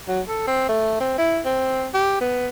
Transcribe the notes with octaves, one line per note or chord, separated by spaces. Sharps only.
F#3
A4
C4
A3
C4
E4
C4
G4
B3